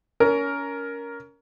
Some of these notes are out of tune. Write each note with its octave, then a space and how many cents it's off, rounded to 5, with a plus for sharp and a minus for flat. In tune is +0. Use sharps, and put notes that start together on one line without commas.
C#4 +25 A#4 +5